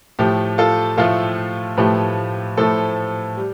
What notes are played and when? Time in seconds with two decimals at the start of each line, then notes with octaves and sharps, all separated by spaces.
0.19 A2 F3 A3 G4
0.58 F4 A4
0.98 A2 F3 A3 F4 A4
1.77 A2 F3 A3 G4 B4
2.57 A2 F3 A3 A4 C5
3.37 G3